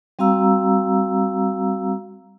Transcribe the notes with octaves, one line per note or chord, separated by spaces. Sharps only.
G3 C4 F#4 F5 A#5 E6